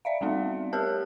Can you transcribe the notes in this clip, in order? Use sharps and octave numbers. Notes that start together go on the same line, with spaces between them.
D5 E5 F5
G3 A3 B3 C4 D#4
G4 A#4 A5 F6 F#6